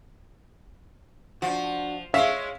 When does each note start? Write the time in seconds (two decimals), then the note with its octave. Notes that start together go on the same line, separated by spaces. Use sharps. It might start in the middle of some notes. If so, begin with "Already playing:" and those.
1.42 F3 D4 F#4
2.14 G#3 C#4 C#5 E5 F5